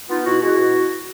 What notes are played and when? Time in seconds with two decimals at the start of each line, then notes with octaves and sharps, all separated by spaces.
0.09 B3 D#4 F4
0.26 B2 E4 F#4
0.41 G#3 E4 F#4
0.58 B2